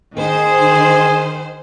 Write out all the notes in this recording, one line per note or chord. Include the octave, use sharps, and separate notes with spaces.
D#3 G#4 C5